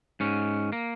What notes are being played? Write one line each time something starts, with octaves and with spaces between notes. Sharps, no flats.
G#2 C#4
A#3